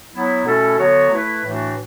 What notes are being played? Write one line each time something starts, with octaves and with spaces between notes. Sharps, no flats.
F#3 B3 E4
B2 A3 C#4 E4 A4
D3 F#3 B3 F#4 C#5
A3 E4 B4
A2 E3 A3 D4 F#4